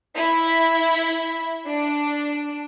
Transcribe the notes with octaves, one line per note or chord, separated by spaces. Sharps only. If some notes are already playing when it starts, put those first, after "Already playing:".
E4
D4